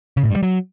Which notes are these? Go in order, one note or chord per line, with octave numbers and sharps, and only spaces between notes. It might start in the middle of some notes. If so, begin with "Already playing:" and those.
C#3
A2
G2
G3
F#3